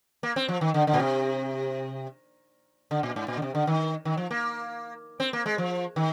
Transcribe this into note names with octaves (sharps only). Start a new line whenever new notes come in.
A#3
C4
F3
D#3
D3
D3
A#2
C3
D3
A#2
G#2
A#2
D3
C3
D3
D#3
D#3
F3
A#3
C4
A#3
G#3
F3
D#3